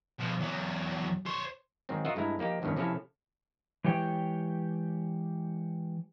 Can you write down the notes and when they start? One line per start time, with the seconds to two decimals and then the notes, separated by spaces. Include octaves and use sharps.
0.19 B2 F3
0.40 E2 F#3
1.26 C5 C#5
1.89 G#2 D#3 F#3 C4
2.05 F4 F#4 A#4 D#5 E5 F#5
2.16 G2 G#3 A3 E4 A#5
2.39 F3 A#3 D#4 G4
2.62 E2 G2 C3 D#3 C#4
2.76 C3 F3 C#4 E4 A4 F5
3.84 E3 G#3 G4 C#5 G5